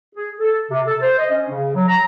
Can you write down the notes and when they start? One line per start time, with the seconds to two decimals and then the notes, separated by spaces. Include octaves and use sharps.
0.15 G#4
0.39 A4
0.70 C3
0.87 A4
1.01 C5
1.18 D#5
1.31 C#4
1.50 C#3
1.76 F#3
1.88 A#5